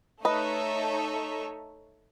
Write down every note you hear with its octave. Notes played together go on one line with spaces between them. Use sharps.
A3 D#4 A4 B4 C#5 D#5 E5